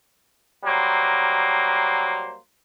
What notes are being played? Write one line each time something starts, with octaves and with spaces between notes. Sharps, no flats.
F#3 G3 A#3 C5